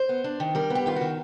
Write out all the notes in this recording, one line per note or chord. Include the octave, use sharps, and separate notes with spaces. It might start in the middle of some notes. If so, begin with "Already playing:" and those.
Already playing: C5
B3
D4
D#3
G3 A#4
B3
G4
D#3 F4
D#3 F#4